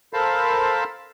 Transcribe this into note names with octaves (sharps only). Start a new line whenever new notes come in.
A4 A#4 C5 F5 A5 B5